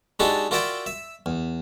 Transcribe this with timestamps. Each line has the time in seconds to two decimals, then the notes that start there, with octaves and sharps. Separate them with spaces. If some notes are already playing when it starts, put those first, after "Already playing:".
0.20 G#3 D4 D#4 F#4 G4 A4
0.51 F4 F#4 A#4 D5 E5 G5
0.86 E5
1.26 E2